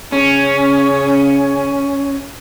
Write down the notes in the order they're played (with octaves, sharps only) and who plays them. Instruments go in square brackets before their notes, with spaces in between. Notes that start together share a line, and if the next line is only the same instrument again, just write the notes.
[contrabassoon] C#3 [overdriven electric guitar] C#4